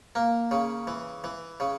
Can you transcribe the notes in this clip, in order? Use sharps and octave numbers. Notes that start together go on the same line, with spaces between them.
A#3
C#3
E3
E3
C#3